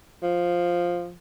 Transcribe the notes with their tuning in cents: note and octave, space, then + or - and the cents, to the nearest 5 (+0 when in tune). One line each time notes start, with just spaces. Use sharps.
F3 +5